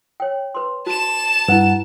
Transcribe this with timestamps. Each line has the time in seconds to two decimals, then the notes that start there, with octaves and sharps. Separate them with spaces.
0.20 C#5 G5
0.55 B4 C6
0.87 F#4 A5 E7
1.48 G2 E4 B4 F#5